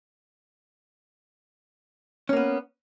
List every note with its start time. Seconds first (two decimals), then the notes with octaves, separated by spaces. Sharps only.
2.29 C#4
2.33 A#3
2.37 B3